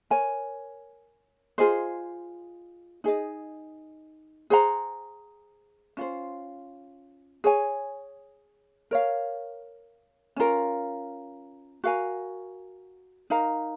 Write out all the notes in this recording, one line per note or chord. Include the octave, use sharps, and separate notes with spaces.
A#4 C#5 G#5
F4 G#4 C5 D#5
D#4 G#4 D#5
G#4 C5 F#5 A#5
C#4 F4 C5
G#4 C#5 G#5
A#4 C#5 F5
C#4 F4 A#4
F#4 A#4 F5 G#5
D#4 A#4 F5 A#5